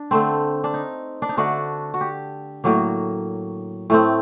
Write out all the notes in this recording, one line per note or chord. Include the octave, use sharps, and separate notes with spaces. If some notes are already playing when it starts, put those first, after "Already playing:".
Already playing: D4
D3 A3 C4
D4
D#4
D4
D#4
D3 A3 D4 F#4
F#4
G4
A2 F#3 A#3
A2 A3 C4